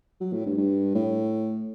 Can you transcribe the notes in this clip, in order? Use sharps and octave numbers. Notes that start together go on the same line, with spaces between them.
F#3
A2
G2
G2
A2